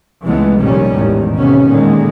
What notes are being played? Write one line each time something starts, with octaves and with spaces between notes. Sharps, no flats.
C#2 E3 G#3 A3 B3
F1 C2 A#2 D#3 G3 C#4
A1 E2 G#2 D#3
C3 A3 B3 C#4
A#2 D3 D#3 G#3